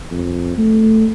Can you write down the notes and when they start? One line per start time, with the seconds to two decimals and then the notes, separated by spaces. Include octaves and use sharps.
0.11 F2
0.58 A3